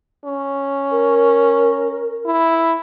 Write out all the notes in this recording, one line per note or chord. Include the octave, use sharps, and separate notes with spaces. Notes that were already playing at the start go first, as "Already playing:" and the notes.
C#4
A#4
E4